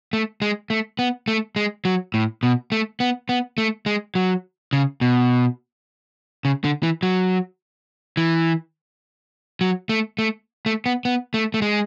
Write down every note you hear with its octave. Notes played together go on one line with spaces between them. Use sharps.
A3
G#3
A3
B3
A3
G#3
F#3
A2
B2
A3
B3
B3
A3
G#3
F#3
C#3
B2
C#3
D3
E3
F#3
E3
F#3
A3
A3
A3
B3
B3
A3
A3
G#3